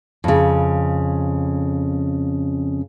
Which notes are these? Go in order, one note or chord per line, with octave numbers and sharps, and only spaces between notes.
F2 C#3